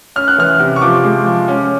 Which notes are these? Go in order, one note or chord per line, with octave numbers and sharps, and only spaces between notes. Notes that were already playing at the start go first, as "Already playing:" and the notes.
C#4 F6
F#6
E3 F6
C3
C#6
F3 D6
G#3
F3
C#4